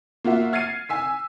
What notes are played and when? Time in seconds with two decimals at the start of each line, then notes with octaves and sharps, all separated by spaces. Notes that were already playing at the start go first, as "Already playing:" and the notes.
0.24 A#3 F4 F#4 E5
0.53 F6 G#6 A6 C7 C#7 D#7
0.89 G#5 E6 B6